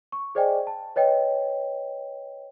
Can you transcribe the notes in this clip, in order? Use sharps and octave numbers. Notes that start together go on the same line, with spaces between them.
C#6
G#4 C5 D5 D#5 G5 G#5
A5
B4 C#5 D#5 G5